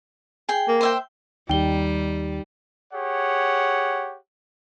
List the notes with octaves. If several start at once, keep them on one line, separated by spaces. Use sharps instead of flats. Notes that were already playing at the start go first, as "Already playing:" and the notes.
G#4 G5
A#3
C5 E5 G5
D#2 G3 D#4 G4 G5 G7
G4 G#4 C#5 F#5